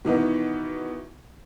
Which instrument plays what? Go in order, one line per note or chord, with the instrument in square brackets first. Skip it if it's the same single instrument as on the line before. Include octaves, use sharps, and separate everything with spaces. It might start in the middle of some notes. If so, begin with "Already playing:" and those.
[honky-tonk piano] B2 D#3 E3 B3